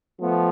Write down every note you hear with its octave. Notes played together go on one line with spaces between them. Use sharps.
F3 A3 B3